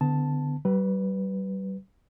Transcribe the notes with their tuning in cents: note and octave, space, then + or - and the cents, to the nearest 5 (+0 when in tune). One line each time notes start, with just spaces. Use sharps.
D3 +0 B3 +35 A5 +0
G3 -40 B4 +0